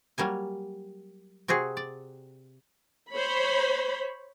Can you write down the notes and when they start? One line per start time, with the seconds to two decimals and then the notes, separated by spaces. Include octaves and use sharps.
0.18 F#3 G3 A#3 G#5
1.48 C3 C4 F#4 G#4
1.77 D5
3.12 C5 C#5 B5